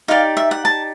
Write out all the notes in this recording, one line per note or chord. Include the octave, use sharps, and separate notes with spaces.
D#4 G4 B4 D5 F5
E5
F#5
A5